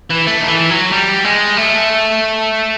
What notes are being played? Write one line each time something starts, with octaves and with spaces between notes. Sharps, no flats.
E3
A3
D#3
E3
F#3
G3
G#3
A3